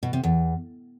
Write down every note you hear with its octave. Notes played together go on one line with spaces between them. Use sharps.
B2
C3
E2